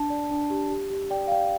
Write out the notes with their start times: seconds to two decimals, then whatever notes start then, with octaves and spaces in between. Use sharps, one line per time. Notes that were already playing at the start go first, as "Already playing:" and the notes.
Already playing: D4 A5
0.10 D5
0.31 D4
0.50 G4
0.70 G4
0.90 G4
1.10 D5 G5
1.27 F5
1.32 D5 G5